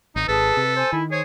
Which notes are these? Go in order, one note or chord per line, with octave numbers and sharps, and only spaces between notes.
G#1 D#4
G#1 G#4 A4 B4 A5 D#6
C3
C5 G#5
D#3 E4
G#4 C5 C#5